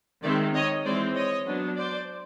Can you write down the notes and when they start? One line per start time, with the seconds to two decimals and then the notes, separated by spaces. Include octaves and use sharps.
0.23 D#3 G#3 C4 D5 E5
0.54 C#5 D#5
0.85 E3 G#3 C4 C5 D5
1.16 C#5 D#5
1.46 F#3 B3 D4
1.77 C5 D5